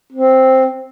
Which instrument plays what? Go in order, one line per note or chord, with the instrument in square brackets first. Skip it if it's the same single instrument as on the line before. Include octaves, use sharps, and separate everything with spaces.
[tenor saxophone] C4